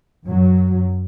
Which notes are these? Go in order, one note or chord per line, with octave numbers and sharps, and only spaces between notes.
F#2 F#3